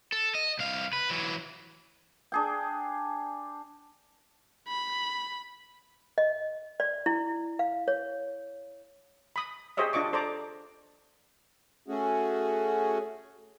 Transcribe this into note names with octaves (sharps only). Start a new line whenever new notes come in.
A4
D#5
C2 F5
B4
E3 F#3
D4 G#4 G5
B5
D#5
D5
E4
F5
C#5
B5 D#6
G4 G#4 C5 C#5 D#5 E5
D4 F4 D#5 C#6 D6
A4 C5 D5 A#5 D6
A3 C#4 F#4 G#4